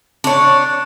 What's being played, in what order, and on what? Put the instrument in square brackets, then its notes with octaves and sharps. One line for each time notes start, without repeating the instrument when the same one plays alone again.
[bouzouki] D4 C#5